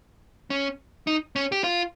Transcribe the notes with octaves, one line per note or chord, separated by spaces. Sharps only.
C#4
D#4
C#4
G4
F4